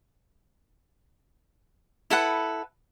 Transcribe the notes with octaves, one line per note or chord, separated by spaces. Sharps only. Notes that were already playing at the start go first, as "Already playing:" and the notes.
E4 A4 B4 F#5